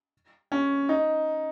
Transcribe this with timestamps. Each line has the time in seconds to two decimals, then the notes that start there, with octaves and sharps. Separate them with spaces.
0.52 C#4
0.89 D#4